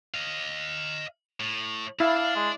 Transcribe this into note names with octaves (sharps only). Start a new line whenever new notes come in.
D#5 F5
A2
E4 D5 F5 A5
G#3